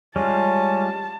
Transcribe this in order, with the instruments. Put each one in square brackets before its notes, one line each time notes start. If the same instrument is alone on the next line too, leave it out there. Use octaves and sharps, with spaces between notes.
[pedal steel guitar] G3 G#3 F4 [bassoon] C#4 [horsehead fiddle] A5